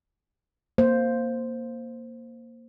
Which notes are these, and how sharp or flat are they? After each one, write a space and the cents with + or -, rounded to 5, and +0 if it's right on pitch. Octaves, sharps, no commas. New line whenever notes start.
A#3 +0 C5 +0